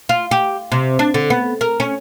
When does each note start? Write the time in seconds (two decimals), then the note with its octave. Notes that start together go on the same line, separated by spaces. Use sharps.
0.09 F4
0.31 G4
0.72 C3
0.99 D4
1.14 D3
1.30 B3
1.61 A#4
1.80 C#4